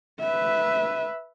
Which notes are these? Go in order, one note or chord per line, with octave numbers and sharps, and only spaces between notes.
B4 E5